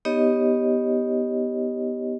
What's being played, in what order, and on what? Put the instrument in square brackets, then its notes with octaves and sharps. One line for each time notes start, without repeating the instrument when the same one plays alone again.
[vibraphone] B3 D#4 G4 C#5 D#5